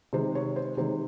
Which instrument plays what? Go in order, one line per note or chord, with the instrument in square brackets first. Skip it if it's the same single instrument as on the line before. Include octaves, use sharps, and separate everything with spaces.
[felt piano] C3 D#3 G#3 C5
C#5
C5
C3 D#3 G#3 C5